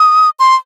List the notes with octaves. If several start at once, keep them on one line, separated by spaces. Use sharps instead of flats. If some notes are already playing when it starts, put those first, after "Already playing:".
Already playing: D#6
C6